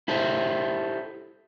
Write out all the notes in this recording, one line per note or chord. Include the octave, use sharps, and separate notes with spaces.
E4 G4 A4 C5